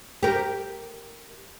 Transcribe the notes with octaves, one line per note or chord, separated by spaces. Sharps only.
G4 A#4